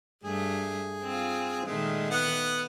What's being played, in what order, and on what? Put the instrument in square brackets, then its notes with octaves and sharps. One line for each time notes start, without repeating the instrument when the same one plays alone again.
[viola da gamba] G2 A3 [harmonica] G#4
[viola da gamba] C4 F4
[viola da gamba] A#2 D#3 A3 [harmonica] G#3
[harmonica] B3 F#5